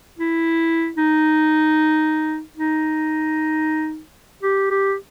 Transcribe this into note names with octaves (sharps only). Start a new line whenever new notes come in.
E4
D#4
D#4
G4
G4